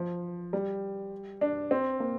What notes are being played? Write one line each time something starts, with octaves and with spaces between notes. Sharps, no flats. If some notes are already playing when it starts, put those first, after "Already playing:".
Already playing: F3
G3
D4
C4
A#3